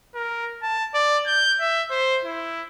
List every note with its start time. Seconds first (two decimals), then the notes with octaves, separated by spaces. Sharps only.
0.15 A#4
0.63 A5
0.94 D5
1.26 G6
1.60 E5
1.91 C5
2.25 E4